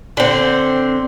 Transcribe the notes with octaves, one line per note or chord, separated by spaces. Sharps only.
D3 C4